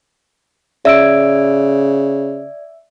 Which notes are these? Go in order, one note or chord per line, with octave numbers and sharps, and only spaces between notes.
C#3 D5 E5 E6 D7